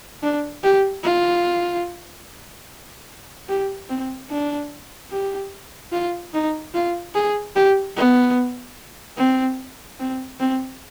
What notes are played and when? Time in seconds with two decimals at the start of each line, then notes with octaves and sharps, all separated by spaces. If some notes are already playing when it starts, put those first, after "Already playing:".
0.23 D4
0.64 G4
1.04 F4
3.49 G4
3.89 C4
4.30 D4
5.11 G4
5.92 F4
6.34 D#4
6.74 F4
7.15 G#4
7.56 G4
7.96 B3
9.18 C4
10.00 C4
10.40 C4